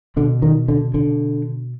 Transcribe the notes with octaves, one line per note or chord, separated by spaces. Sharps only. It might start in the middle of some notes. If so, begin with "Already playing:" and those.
B2 D3
D#3
D3
D3